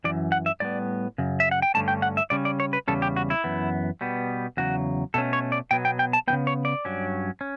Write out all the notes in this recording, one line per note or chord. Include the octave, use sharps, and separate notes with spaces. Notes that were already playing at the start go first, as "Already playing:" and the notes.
F#2 E3 D5
F#5
E5
A2 G3 B3 D5
F#2 C#3
E5
F#5
G5
G2 D3 A3 C#4 A5
G5
F#5
E5
C#3 G3 C#4 D5
D5
C#5
B4
E2 C#3 G3 C#4 A4
G4
F#4
E4
F#2 E3 B3
B2 G3 B3
E2 C#3 F#3 F#4
B2 A3 C#4 A4
C#5
D5
B2 F#3 B3 G5
G5
G5
A5
E3 B3 G5
C#3
C#5
D5
G2 F#3 C#4
C#4